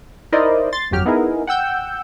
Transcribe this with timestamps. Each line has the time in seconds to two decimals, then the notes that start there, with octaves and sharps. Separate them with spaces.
0.32 D#4 E4 A#4 C5 D5 D#5
0.73 C6 A6
0.91 G1 F2 F#3 G4 F6
1.06 B3 D#4 E4 G#4 A#4
1.47 F#5 G5 E6 G6